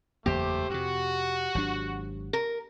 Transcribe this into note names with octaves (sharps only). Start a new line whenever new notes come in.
F#1 E2 A3 A#3 G4 C5
F2 C3 F#4
G#1 F#3 D4
A#4